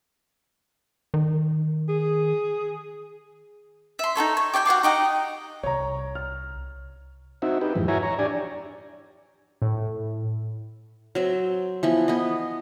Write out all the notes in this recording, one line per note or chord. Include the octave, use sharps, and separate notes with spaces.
D#3
G#4
E5 C6
D#4 F4 A4 C#5
C#5
G4 D5 G5 G#5
F#4 C#5 F5 D6
D#4 G4 D#5 F#5
C2 C#5 A#5
F6
C4 D#4 F#4 E5
D#4 G4 B4
F2 G#2 E3
E4 F#4 C#5 E5 G#5 A#5
C#5 A#5
D4 G4 D5 G#5
A2
F#3 C4 E5
E3 F3 B3
B3 D#5